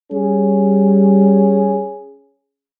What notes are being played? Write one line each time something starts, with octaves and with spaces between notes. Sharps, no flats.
G3 C#4 G#4